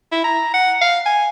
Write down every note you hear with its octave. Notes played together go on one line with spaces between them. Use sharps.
E4
A#5
F#5
F5
G#5